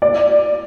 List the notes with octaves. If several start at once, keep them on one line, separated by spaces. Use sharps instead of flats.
D5